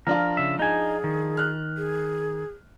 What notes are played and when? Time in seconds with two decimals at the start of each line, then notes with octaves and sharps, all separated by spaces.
0.07 F3 D4 F4 A#4
0.37 C#3 E5
0.59 D#4 G#4 G#5
1.04 D#3
1.37 F6 F#6
1.77 G#4